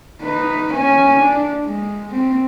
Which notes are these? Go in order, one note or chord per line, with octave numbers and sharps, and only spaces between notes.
D#4 B4
C#4 G#5
D4
G#3
C4